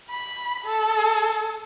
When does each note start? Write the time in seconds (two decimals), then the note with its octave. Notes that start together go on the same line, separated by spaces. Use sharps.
0.10 B5
0.65 A4